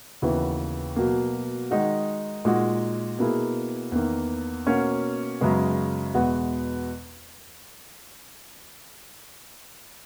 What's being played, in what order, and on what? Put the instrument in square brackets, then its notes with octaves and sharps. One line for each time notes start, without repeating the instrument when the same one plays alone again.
[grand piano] D#2 C#3 E3 B3 F#4
B2 F#3 A#3
D#3 G#3 D#4 F#4
A#2 G#3 D#4 F#4
B2 A#3 E4 G#4
E2 D#3 A#3
B2 A#3 C#4 F#4
F#2 C#3 G#3 B3
E2 B2 G#3 B3 F#4